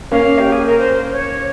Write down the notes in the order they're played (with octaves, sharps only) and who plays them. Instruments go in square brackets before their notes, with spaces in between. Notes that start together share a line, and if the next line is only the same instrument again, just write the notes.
[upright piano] A#3 C#4 [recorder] F5
[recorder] G4
G#4
A#4
C5
C#5